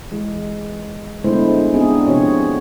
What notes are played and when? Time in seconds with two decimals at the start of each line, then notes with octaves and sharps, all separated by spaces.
0.11 E3 G#3
1.24 D3 G#3 A3 B3 E4 C5
1.74 B3 C4 D4 D#4 G#4
2.08 C3 F3 F#4 C#5